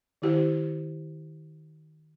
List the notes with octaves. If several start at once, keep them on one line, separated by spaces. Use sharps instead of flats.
D#3 E4 G4 C5